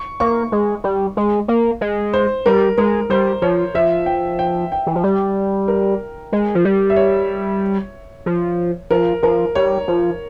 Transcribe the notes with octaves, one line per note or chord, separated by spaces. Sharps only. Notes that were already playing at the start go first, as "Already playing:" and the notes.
Already playing: C#6
A#3 C#6
G#3
G3
G#3
A#3
G#3
C5
G3 A#4
G#3 A#4
G3 C5
F3 C#5
F3 E5
G5
G5
G5
E3
F3
G3
A#4
G#3
F3
G3
E5
C#5
F3
F3 A#4
F3 A#4
G3 C#5
F3